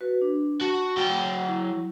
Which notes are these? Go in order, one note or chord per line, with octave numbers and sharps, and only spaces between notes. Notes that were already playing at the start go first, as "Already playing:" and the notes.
F#4 B4
D4
F#4 A5
F#3 G5
E4